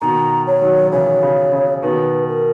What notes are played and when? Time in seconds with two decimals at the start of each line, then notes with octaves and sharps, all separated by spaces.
0.01 B2 D#3 A#5
0.47 C#5
0.62 D#3 F#3
0.87 D#3
0.91 C#3 E3 C#5
1.23 C#3
1.52 C#3
1.82 B2 D#3 B4
2.28 A#4